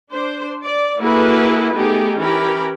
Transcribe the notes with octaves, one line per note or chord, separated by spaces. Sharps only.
D4 C5
D5
A#3 E4 F#4 G#4 A4 B4
A3 B3 D#4 G4 G#4
E3 C#4 G4 A#4 B5